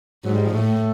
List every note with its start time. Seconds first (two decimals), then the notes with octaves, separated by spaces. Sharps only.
0.24 G#2 F#3
0.35 G3
0.45 F3
0.54 A2 A3